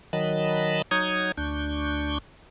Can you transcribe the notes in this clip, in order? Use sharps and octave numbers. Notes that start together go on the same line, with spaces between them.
D#3 F#3 D#5 A5 B5
F#3 D#4 C#5 D#6 G#6
D2 D4 C#6 G6